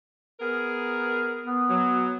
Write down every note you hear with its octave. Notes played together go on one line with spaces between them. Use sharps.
B3 G#4 A#4
B3
F#3